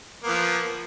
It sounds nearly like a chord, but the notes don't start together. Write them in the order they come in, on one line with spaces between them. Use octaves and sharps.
A#3 B3 F3